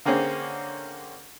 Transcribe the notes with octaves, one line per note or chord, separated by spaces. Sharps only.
D3 A#3 C4 C#4 G#4